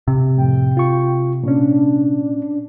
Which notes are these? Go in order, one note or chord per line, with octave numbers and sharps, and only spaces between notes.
C3
F2 A2 G5
F4 C#6
A#2 C#4 D4